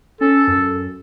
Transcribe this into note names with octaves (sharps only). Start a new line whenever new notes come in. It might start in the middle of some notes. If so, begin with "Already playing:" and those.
C#4 A4
F#2